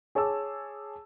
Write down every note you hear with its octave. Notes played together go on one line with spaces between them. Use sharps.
G#4 C#5 A5 D6 E6